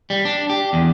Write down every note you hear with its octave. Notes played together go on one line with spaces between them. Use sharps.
G3
D4
G4
E2